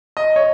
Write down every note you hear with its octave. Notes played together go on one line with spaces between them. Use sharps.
D#5
C#5